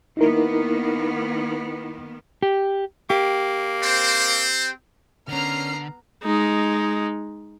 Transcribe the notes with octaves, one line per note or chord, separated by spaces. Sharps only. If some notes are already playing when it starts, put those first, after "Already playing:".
D#3 A#3 B3 D#4 E4 A#4
G4
A#3 G4
C4 C5
D3 B3 C#4 A#4 A#5 F6 C7
G#3 D#4